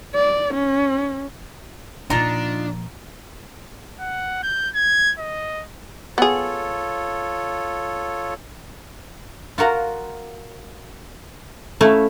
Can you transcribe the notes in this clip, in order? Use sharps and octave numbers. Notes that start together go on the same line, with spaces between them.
D5
C#4
A#2 F3 D4 D#4 F4 A#5
F#5
G6
G#6
D#5
B3 F4 G#4 A4 C#5
F4 F#4 A#4 F#5
A3 C#4 E4 E5 F5